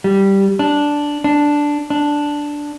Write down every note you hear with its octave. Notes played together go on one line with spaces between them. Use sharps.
G3
D4
D4
D4